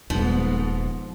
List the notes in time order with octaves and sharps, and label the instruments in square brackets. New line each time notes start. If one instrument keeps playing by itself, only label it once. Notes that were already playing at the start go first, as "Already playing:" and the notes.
[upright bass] D#1 D#4 [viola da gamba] G#2 B3 [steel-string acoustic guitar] F3